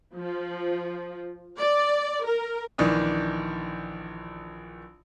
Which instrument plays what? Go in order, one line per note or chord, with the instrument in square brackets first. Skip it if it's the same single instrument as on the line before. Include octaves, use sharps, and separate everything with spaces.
[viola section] F3
D5
A#4
[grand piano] A#1 D#3 E3 D4 D#6